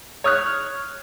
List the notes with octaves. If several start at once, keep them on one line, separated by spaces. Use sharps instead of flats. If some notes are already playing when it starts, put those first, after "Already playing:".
C#5 D#6 F6 F#6